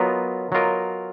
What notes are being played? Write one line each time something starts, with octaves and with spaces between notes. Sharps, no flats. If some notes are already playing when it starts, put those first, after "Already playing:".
Already playing: F#3 B3 F4 A#4 D#5
F#3 B3 F4 A#4 D#5